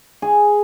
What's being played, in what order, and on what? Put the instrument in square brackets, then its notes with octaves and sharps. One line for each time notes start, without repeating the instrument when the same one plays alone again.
[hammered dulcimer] G#4